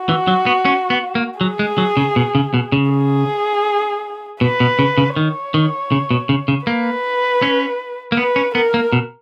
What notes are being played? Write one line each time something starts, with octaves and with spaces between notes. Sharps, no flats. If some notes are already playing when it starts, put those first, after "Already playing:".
Already playing: F#4
E3
F#3
B3
C#4
B3
A#3
F#3 G#4
G#3
F#3
C#3
B2
C#3
B2
C#3
G#4
B2 B4
B2
C#3
C#3
D#3 C#5
D#3
C#3
B2
C#3
C#3
A#3 B4
C#4
A#3
B3 B4
C#4
B3 A#4
A#3
B2